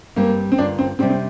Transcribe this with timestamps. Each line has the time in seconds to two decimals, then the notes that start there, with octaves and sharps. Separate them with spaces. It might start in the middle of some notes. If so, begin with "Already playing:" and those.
0.16 G2 G3 A#3 C4
0.52 C4
0.58 G2 D3 A#3 D4 F4
0.79 C4
0.99 C3 G3 C4 D4 G4
1.10 C4